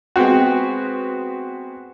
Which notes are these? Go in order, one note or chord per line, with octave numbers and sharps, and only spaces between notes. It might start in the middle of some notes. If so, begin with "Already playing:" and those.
G#3 B3 C4 F#4